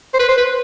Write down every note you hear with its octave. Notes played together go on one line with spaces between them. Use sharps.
C5
B4
C5
B4